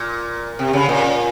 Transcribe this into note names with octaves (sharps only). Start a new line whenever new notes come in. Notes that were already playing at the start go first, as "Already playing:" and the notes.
Already playing: A#2
C3
C#3
A#2